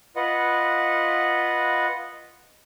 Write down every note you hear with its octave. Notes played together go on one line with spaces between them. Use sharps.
F4 B4 D#5 F#5